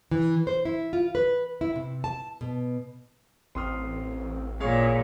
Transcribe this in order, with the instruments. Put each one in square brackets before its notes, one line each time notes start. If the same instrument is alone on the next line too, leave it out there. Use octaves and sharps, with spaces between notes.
[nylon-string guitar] E3
C5
E4
F4
B4
E4
C3
A5
B2
[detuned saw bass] A1 [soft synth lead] C4 [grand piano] C6 D#6 F6
[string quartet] A#2 [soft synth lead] G#4 [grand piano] C#5 F5